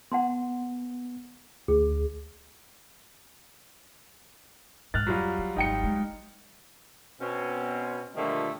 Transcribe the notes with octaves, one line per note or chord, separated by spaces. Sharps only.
B3 F#5 A5 C6
D2 G#4
G#2 F6 F#6 A6
F2 F#3 G3 F4
E3
G#1 D#4 G5 C#7
G#3
B2 C4 C#4
A#2 D3 D#3 F3 G3 A3